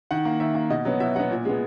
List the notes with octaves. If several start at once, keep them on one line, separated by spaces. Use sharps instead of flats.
D#3 F#5
A#3
D#3 E5
A#3
B2 D#5
F#3 B3
B2 E5
F#3 B3 F#5
A#2
G#3 B3